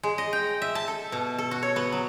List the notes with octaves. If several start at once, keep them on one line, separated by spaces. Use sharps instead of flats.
G#3
D#5
G5
E5
A5
A4
B2
A4
F#4
C#5
B3
F#3